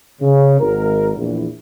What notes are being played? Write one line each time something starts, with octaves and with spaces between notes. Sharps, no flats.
C#3
G#1 A#4
A#1 E2